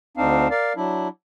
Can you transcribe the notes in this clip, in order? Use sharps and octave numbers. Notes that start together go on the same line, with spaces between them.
D2 C4 D4 D#4 F5
A#4 D5 F5
F#3 D4 E4